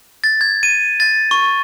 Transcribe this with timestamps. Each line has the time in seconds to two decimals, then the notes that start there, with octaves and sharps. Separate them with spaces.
0.24 A6
0.41 G#6
0.63 D#7
1.00 A6
1.31 C#6